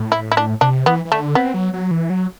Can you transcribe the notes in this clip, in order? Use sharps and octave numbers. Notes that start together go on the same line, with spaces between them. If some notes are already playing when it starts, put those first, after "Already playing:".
Already playing: A2
E4
E4
D4
C3 D4
E3 B3
E3
D3 A3
B3 C4
F#3
F#3
E3
F#3